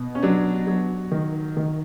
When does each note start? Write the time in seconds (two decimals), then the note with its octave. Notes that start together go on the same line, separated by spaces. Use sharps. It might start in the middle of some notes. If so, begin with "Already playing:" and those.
Already playing: B2
0.15 C#4
0.23 F#3 D4
0.67 F#3
1.12 D#3
1.57 D#3